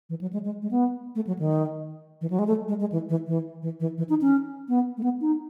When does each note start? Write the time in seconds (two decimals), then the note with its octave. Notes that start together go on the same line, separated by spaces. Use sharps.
0.09 E3
0.21 F#3
0.33 G#3
0.45 G#3
0.62 G#3
0.71 B3
1.15 A3
1.27 F#3
1.39 D#3
2.21 E3
2.30 F#3
2.39 G#3
2.47 A3
2.68 G#3
2.80 G#3
2.92 E3
3.09 E3
3.27 E3
3.62 E3
3.80 E3
3.98 E3
4.09 D#4
4.21 C#4
4.68 B3
4.97 A3
5.03 B3
5.21 D#4